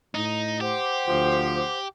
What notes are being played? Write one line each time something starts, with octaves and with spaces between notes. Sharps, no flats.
A2 D#4
G4 C5 F#5 D6
D2 F3